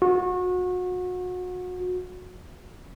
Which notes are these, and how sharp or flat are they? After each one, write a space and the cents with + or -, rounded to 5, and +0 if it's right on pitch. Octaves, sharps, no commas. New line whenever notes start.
F#4 -30